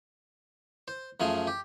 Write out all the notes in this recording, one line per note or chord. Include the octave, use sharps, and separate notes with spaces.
C5
F#2 F3 A3 G#4 C6
G4